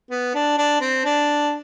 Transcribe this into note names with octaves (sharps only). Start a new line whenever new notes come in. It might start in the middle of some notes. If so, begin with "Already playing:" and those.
B3
D4
D4
C4
D4